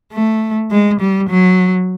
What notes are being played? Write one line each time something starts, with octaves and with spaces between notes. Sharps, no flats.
A3
G#3
G3
F#3